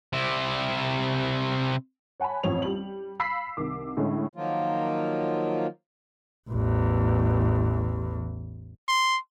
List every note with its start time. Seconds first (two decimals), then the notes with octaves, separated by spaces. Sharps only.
0.13 C3 E4
2.20 C#5 F#5 G#5 A5 B5
2.43 A1 F2 C4 C#5 F7
2.62 G3 F#7
3.19 F5 B5 E6 B6 C7
3.57 C2 D#3 D6
3.97 A2 D3 G#3 C#4
4.35 D#3 F3 F#3 A#3 F4
6.50 A1 E2
8.88 C6